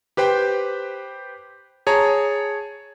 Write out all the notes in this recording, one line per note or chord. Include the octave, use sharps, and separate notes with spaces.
G4 B4 C5 G5
G#4 C#5 A5 A#5